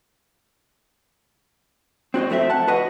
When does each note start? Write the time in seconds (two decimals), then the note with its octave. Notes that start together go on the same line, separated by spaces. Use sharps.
2.14 C4 F#4 C#5 D#5
2.30 F2 A3 C4 E4 E5
2.50 F#5 A5
2.67 F#4 B4 D#5 F#5